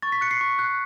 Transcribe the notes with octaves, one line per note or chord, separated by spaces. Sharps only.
C#6 A6
B6
F#6 C#7
C7
C#6
F#6